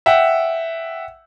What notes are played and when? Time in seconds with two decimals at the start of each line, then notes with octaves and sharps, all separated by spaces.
0.06 E5 F#5 G5